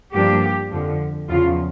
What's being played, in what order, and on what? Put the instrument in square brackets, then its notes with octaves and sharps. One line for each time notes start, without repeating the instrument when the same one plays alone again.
[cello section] G2 F3 A#3 D4 G4
F2 D3 F3
E2 C#3 F3 F4